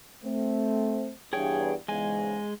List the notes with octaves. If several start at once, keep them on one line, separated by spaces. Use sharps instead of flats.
A3 C4
E2 G2 G#4 C#5 G5
E2 G#2 C#3 G#3 G#5